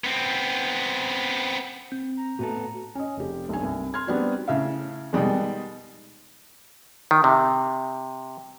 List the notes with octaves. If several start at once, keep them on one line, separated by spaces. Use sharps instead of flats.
B3 C4
C4 G6
A#5
A2 B3 F#4 A4
C#4 D#5
F1 G4
B1 G2 G#5
C2
C6 F6 G#6
G3 B3 C4 D4 D#4 F#4
A2 C#3 E5 F5
B2 D#3 G3 G#3
D#3
C3